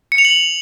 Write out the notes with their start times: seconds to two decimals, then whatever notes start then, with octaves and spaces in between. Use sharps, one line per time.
0.12 C#7
0.18 F7
0.25 F#7